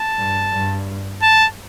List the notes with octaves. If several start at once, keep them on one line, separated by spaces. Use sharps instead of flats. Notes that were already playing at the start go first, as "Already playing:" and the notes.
Already playing: A5
G2
G2
A5